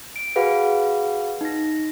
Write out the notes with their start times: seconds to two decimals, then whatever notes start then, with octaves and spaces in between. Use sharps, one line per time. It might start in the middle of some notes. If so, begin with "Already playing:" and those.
0.16 D7
0.36 F#4 G#4 B4 F5 F#5
1.41 D#4 A#6